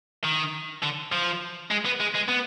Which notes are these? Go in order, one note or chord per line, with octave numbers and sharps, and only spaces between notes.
D#3
D3
F3
G#3
B3
G#3
G#3
B3